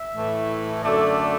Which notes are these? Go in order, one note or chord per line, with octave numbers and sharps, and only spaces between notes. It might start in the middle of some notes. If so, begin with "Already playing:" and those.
Already playing: E5
A2 E3 A3
F#2 D3 A3 D5